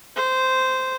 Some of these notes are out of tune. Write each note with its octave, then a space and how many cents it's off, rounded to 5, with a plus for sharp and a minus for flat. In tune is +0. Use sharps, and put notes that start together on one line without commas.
C5 -10